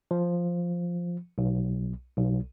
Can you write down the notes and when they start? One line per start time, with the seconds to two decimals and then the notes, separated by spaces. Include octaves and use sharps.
0.11 F3
1.38 B1
2.17 B1